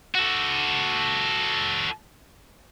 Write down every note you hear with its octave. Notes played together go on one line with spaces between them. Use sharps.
F#4 A4